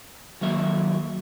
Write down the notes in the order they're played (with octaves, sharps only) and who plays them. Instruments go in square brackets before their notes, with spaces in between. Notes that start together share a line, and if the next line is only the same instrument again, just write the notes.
[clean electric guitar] D#3 F#3 A#3 E5